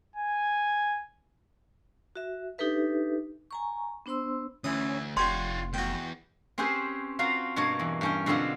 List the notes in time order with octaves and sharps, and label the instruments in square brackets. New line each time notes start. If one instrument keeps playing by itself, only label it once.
[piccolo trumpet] G#5
[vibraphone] F#4 E5
D4 D#4 G4 A4 B4 E5
G#5 A#5 C#6
B3 D4 C5 C6 E6
[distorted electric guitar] D2 [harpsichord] E3 D#6 [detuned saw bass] C#4
[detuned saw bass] F1 [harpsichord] D4 G4 C#5 [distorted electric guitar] F4 F#5 [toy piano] C6
[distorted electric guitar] E2 [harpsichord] F#4 G5
[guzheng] C4 C#4 G4 G#4 B4 C5
C4 F4 F#4 F5 A#5
G2 B2 A#3 C#5
E2
G2 C#4 G5
B2 D3 F#3 C4 F4